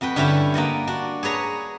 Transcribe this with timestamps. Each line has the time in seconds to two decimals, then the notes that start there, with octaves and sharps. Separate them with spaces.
0.01 F2 F#4 B4 G5
0.16 G2 D3 C#4 E4 G4 A5
0.54 A#3 D5 D#5 F#5
0.87 D4 F#4
1.23 G#4 B4 C#5 A#5